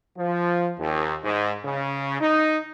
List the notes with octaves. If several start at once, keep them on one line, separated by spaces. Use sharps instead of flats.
F3
D#2
G#2
C#3
D#4